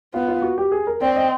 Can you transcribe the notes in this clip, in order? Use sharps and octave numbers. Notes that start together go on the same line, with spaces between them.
B3 F4
F4
F#4
G4
G#4
A#4
C4 D5
D#5